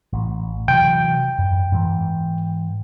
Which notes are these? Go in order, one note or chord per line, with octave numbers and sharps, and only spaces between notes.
A1
C3 E3 F#3 G5
F#2
G#2 E3